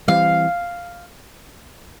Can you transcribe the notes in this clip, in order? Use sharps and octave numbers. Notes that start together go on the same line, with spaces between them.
E3 G3 C4 F5